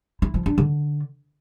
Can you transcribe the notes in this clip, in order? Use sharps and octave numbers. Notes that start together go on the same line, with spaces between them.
E4
F3
D4
D3